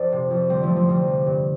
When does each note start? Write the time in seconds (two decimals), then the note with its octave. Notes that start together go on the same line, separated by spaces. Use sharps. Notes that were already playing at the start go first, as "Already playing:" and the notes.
Already playing: F2 A4 C5 D5
0.12 C3
0.30 F2
0.49 D3 G3 C4
0.63 F3 A3
0.70 D3
0.76 F3
0.89 F2 G3
1.08 C3
1.26 G2